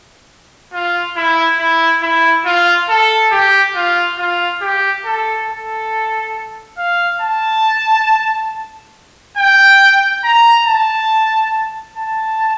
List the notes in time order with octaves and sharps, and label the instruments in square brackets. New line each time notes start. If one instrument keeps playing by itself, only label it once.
[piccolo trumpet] F4
E4
E4
E4
F4
A4
G4
F4
F4
G4
A4
A4
F5
A5
G5
A#5
A5
A5